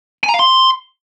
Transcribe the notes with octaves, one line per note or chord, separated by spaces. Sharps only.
G#5
A#5
F5
C6